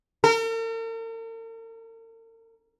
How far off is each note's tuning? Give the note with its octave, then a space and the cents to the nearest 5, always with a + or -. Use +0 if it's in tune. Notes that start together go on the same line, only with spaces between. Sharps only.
A#4 -45